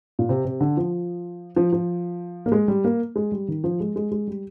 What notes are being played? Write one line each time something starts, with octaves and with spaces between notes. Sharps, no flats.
A#2
C3
C3
D3
F3
F3
F3
A#3
G#3
G3
A#3
G#3
G3
D#3
F3
G#3
G#3
G#3
G3